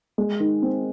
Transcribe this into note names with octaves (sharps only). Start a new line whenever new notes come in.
G#3
D#3
C4